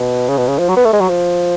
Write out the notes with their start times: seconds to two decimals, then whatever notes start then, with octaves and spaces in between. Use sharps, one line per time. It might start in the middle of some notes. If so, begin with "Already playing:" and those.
Already playing: B2
0.28 C#3
0.38 B2
0.48 C#3
0.59 F3
0.69 F#3
0.77 B3
0.85 A3
0.93 G#3
1.01 F#3
1.09 F3